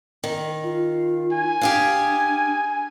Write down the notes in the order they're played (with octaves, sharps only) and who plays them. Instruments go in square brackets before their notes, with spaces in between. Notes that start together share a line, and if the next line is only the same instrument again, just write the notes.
[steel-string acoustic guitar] D#3
[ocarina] F4
[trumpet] G#5
[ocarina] D4 [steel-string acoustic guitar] G4 G#4 F5